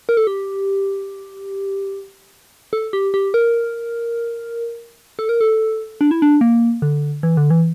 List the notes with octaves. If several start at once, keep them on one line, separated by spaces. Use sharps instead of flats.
A#4
A4
G4
A4
G4
G4
A#4
A4
A#4
A4
D4
E4
D4
A#3
D3
E3
D3
E3